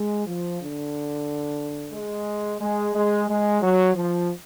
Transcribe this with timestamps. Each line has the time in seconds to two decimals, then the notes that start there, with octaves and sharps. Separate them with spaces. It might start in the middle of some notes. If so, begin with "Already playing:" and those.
Already playing: G#3
0.26 F3
0.60 D3
1.93 G#3
2.60 G#3
2.94 G#3
3.28 G#3
3.61 F#3
3.95 F3